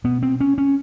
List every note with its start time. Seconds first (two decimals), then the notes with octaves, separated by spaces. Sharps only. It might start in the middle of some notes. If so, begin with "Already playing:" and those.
0.04 B2 B3
0.23 C4
0.40 C#4
0.58 C#4